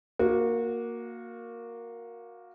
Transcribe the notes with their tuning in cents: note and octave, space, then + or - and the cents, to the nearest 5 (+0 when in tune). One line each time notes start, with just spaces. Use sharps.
A#3 +0 F#4 -20